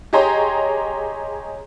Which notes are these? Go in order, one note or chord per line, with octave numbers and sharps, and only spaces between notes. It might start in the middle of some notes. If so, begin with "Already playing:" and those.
G4 G#4 C#5 D#5 A#5 C6